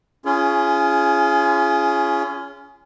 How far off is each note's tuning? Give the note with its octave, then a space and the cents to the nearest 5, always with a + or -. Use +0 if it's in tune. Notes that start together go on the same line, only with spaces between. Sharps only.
C#4 +15 F4 -35 G#4 +0